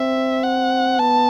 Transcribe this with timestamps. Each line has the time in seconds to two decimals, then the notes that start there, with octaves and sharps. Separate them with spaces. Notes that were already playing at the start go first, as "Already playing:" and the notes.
Already playing: C4 E5
0.43 F#5
0.99 B3 A5